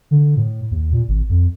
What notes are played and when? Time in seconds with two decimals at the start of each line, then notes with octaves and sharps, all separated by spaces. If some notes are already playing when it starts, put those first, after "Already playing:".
0.11 D3
0.37 A2
0.71 D#2
0.92 A#2
1.08 G#1
1.29 F2